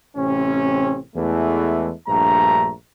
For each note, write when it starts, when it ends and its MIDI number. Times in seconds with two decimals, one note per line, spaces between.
0.16 0.99 33
0.16 0.99 48
0.16 0.99 60
0.16 0.99 61
1.16 1.92 40
1.16 1.92 52
1.16 1.92 56
1.16 1.92 57
2.08 2.71 34
2.08 2.71 43
2.08 2.71 57
2.08 2.71 82